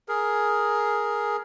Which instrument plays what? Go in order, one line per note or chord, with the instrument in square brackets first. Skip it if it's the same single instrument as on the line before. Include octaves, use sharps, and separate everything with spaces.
[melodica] G#4 A#4